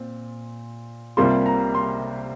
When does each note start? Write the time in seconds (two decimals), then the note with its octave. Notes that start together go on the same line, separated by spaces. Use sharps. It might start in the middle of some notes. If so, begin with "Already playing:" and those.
Already playing: A#2 C4
1.17 C2 C3 G3 A#3 F4 C6
1.46 A#5
1.75 C6